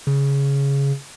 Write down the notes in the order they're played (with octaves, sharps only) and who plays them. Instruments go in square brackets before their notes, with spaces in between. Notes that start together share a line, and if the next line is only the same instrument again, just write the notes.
[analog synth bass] C#3